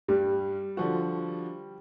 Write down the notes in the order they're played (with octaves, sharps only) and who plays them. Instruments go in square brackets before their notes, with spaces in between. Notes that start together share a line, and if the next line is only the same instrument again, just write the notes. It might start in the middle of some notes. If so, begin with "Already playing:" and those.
[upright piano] G2 [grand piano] G3
[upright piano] D3 F3 F#4